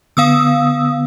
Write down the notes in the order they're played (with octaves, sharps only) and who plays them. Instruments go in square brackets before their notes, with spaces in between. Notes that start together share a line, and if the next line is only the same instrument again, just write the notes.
[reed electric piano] D3 B3 [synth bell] F5 D#6 E6